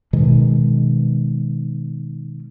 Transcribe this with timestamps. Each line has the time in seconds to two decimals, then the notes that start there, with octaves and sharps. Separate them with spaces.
0.13 B2 D#3 G#3